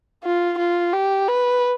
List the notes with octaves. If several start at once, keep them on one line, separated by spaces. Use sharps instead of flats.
F4
F4
G4
B4